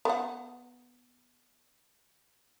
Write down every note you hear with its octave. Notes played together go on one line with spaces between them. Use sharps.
B3 F#5